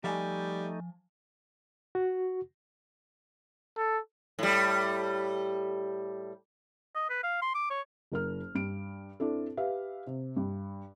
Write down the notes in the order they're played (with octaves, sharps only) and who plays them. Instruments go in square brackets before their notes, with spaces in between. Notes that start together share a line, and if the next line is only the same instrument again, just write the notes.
[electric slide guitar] F3 F5 G#5 [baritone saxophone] G3 [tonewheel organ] A3 D#4
[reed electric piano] F#4
[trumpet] A4
[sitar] A2 G3
[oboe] D#5
B4
F5
C6
D6
C#5
[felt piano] F#1 A#4 F6
G2 D7
C4 D4 E4 A4
G4 B4 E5 F5
C3
G2